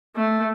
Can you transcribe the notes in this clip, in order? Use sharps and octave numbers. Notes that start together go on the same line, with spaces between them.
A3